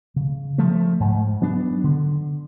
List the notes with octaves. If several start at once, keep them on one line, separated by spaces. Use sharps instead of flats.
C#3
F3 A3
G#2
F#3 B3 D4
D3